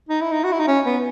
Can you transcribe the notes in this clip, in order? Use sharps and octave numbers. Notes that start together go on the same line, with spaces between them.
D#4
E4
D#4
F#4
E4
D#4
C#4
B3